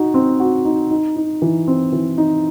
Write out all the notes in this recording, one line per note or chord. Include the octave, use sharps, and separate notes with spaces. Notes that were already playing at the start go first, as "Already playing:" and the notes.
Already playing: D#4 F#4
C4
F#4
D#4
D#4
D#4
E3
C4
E3
D#4